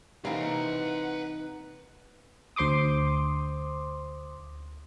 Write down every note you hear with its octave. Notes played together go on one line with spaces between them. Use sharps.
C3 E3 A#3 D#4 B4 F5 F#5 A#5
D2 C5 C6 D6 D#6